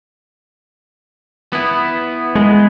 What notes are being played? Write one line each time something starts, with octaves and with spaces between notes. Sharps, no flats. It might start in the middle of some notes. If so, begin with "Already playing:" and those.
B3 E4
G#3